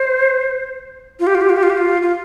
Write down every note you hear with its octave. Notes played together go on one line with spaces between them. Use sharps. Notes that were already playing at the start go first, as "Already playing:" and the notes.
Already playing: C5
F4
G4
F4
G4
F4
G4
F4
G4
F4
F4